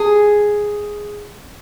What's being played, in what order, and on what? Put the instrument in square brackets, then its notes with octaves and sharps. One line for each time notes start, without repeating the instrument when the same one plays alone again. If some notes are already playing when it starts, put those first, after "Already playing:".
Already playing: [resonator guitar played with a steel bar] G#4